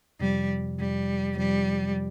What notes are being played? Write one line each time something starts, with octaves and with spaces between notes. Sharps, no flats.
F2 C3 F3 G3
F2 C3 F3 G3
F2 C3 F3 G3